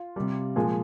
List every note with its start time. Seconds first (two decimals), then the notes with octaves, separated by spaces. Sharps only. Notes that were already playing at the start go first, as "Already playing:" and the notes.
Already playing: F4
0.16 C3 G3
0.56 A#2 F3 G#3 G#4